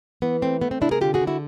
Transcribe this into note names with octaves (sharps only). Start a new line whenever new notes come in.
E3 B3
A3 C4
A3 B3
C4
C3 D4 E4
G#4 A#4
D3 F4 G4
F#4 G#4
D3
E4 F#4